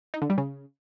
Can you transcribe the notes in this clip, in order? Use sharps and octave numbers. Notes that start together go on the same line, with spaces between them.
D#4
D3
G3
C#3